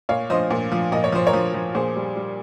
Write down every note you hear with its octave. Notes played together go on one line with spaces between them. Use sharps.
A#2 C#5 F5
F3 C5 D#5
A#2
F3
A#2 D#5
C#5
F3 C5
A#4 C#5
F3
F3
A#2 G#4 C5
G3
G3